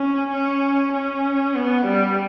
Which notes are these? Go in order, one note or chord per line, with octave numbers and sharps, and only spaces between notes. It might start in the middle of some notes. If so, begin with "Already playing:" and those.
Already playing: C#4
C#4
C#4
B3
G3